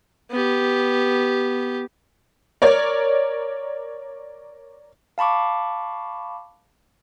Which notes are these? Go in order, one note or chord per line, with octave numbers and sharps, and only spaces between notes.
B3 G4
A#4 C#5 D5
F5 A5 B5 C#6 D6